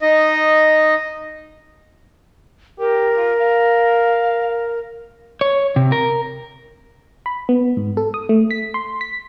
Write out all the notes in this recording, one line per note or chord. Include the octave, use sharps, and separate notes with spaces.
D#4 D#5
G4 A#4
F4
F5
C#5
C3
A#4
B5
B3
G#2
A4
D#6
A3
B6
C6
B6